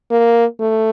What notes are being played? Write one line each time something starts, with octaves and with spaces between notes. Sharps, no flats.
A#3
A3